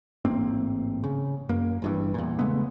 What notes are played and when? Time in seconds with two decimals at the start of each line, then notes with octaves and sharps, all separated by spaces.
0.25 A1 G#2 A#3 C4
1.04 C#3
1.49 F#2 A#3
1.82 G1 G2 E3
2.14 E2 A#2
2.39 C#3 G#3 A3 B3